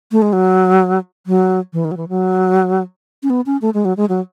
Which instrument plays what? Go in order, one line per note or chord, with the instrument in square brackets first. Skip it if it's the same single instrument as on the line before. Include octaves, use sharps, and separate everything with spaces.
[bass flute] A3
G#3
F#3
F#3
E3
D#3
F#3
E3
F#3
C#4
B3
C#4
A3
G#3
F#3
G#3
F#3